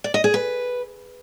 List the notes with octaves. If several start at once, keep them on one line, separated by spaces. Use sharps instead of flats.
D5
D#5
G#4
B4